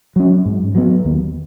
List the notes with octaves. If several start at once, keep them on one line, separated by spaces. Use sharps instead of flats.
F#3 C#4
G#2
F#3 B3
D#2